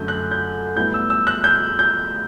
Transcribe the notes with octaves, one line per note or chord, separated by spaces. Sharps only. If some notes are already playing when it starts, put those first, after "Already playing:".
Already playing: F#2 D3 A3 G6
F#6
G6
A2 G3 B3 E4 G6
E6
E6
F#6
G6
G6